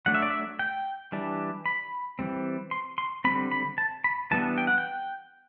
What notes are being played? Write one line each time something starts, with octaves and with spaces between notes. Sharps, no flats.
F#3 A3 D4 F#5
E5
D5
E5
G5
E3 G3 D4
B5
E3 G3 C4
C6
C6
D3 G3 C4 B5
B5
A5
B5
E3 G3 B3 D4 A5
G5
F#5
G5